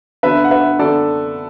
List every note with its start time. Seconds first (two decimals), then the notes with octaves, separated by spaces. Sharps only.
0.23 D3 B3 D4 B4 E5
0.44 F#5
0.51 B4 E5
0.79 D3 B3 D4 A4 D5